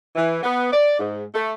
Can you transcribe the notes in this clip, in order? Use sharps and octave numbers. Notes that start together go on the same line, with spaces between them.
E3
B3
D5
G#2
A3